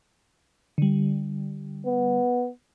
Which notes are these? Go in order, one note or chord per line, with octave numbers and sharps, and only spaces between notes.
D3 G3
B3